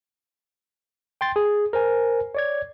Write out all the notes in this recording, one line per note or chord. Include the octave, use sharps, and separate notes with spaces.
G5 C6 A6
G#4
A#4 C5 G#5
C#5 D5 G#6